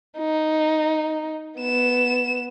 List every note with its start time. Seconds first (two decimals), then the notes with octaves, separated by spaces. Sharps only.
0.18 D#4
1.59 B3 E7